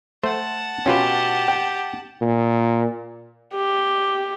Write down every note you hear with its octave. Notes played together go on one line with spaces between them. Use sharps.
A3 C5 F#5 A5
B2 C#4 F4 G4 B4
G5
A#2
G4